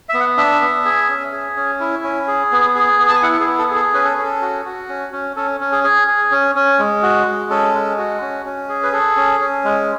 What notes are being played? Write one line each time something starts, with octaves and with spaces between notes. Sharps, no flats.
B3 E5
F#5
D4 E5
B3
G#4
C#4
G#4
C#4
E4
C#4
G#4
B3
G#4
B3
A5
G#5
E4 F#5
G#4
B3
A4
G#4
A4
C#4 B4
A4
C#4 G#4
A4
F#4
F#4
C#4
C#4
C#4 A4
C#4
G#4
G#4
G#4
C#4
C#4
G#3
F#4
G#3
C#4 A4
G#3
F#4
C#4
C#4
G#4
B4
G#4 A4
C#4
C#4
G#3